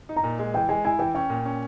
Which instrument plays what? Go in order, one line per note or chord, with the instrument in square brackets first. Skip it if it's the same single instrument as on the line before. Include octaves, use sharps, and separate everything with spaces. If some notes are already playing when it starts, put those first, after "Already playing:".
[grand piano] D#4
[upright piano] A#5
[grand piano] A#2
G#3
[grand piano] E3 [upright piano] G5
[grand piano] G#3 [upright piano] G#5
[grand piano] E4 [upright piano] G#5
[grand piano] E3 [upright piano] G5
[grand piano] C#4 [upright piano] G5
[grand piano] A#2
C#4